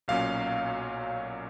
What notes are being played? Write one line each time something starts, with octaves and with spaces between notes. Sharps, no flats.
B1 A#2 F#3 C#4 F5